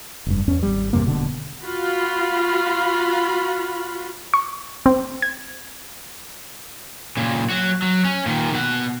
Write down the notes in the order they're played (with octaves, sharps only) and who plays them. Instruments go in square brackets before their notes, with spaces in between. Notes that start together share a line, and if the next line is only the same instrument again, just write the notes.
[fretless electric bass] F1 G2
E2 C#4
G#1 G3
E2 G2 C3 A#3
D#1 B2 D3
[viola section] F4 F#4 B5
[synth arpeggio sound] C#6
C4
G#6
[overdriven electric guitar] A#2 C#3
F#3 F#4
F#3
C#4
A#2 D#3
B2 F#5